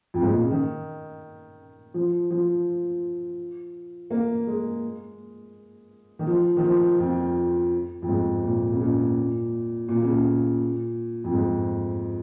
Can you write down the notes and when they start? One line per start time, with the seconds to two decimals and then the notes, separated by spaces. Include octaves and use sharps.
0.14 F2
0.22 G#2
0.32 A#2
0.41 C#3
0.51 D#3
1.94 F3
2.31 F3
4.10 A#3
4.47 G#3
6.19 D#3
6.27 F3
6.57 D#3
6.64 F3
6.99 F2
8.02 F2
8.08 G#2
8.43 A#2
8.72 C#3
8.80 A#2
9.88 A#2
10.01 C#3
10.14 A#2
11.24 F2
11.33 G#2